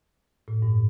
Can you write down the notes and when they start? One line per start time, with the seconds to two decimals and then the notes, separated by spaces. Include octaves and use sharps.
0.48 A2
0.62 G2